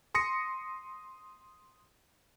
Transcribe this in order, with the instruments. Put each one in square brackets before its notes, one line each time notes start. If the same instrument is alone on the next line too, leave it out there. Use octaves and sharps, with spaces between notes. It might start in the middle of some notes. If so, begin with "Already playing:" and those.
[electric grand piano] C6 D#6 A#6 C#7